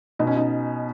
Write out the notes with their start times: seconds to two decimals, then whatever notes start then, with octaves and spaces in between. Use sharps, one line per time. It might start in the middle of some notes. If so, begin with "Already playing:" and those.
0.19 B2 D#4
0.27 C#4
0.37 D#4